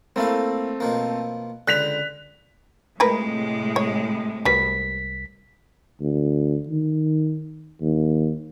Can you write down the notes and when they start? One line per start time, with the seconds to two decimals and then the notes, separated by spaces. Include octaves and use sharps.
0.16 A3 A#3 C4 E4 F5
0.80 B2 F3 A#3
1.68 C#2 D3 G5 F#6 B6 F7
3.00 A2 C3 F3 G#3 A#4 B4
3.76 C#5
4.45 C2 G3 F#4 B4 B6
6.01 D2
6.68 D#3
7.81 D#2